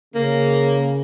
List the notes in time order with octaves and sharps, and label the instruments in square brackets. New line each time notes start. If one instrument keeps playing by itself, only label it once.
[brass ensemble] C#3 [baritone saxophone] A#3